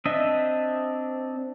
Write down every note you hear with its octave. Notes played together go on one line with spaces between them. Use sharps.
C4 D4 D#5 E5